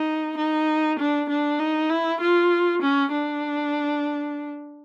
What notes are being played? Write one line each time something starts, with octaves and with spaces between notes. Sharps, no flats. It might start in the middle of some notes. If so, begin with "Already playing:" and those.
Already playing: D#4
D#4
D4
D4
D#4
E4
F4
C#4
D4